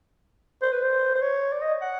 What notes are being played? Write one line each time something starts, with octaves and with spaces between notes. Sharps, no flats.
C5
B4
C5
C5
C#5
D5
D#5
F#5